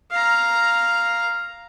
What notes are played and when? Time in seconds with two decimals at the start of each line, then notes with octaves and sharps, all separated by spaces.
0.12 F5 A#5